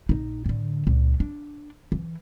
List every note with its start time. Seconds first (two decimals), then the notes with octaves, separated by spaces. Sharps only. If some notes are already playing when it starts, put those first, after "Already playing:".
0.09 A#1 D#4
0.46 A2 D3
0.87 C#2 A#2
1.20 D4
1.92 E3